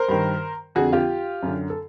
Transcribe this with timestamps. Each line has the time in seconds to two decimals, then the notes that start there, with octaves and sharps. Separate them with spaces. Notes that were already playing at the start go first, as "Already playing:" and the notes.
Already playing: A#4 C5
0.08 G2 D#3
0.75 F2 D3 F#4 G#4
0.92 F4 G4
1.43 F#2 D3
1.70 A4